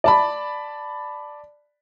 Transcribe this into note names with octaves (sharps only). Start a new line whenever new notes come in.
D5 A5 B5